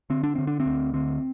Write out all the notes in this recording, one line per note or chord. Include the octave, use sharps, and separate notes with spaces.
D3 C4
D4
D3 C4
D4
C4
D2
D3 C4